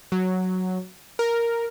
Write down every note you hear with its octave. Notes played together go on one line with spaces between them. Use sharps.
F#3
A#4